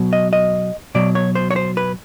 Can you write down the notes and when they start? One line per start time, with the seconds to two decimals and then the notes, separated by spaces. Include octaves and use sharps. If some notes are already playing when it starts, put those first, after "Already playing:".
Already playing: B2 F#3
0.13 D#5
0.33 D#5
0.95 B2 F#3 D5
1.15 C#5
1.35 C5
1.51 C#5
1.56 C5
1.77 B4